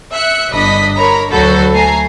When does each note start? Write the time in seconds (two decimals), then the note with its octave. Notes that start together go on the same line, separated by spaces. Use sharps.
0.13 E5 F#6 C#7
0.51 G1 D4 D#5 B5 B6
0.97 A#4 C#5 A#5 B5
1.31 D2 F#3 F#4 A4 B5 G6
1.73 A3 G#5 A#5 C7